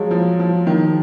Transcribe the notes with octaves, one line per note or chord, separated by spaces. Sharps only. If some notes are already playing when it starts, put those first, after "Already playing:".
Already playing: F3 F#3 G#3
F3
F3
D#3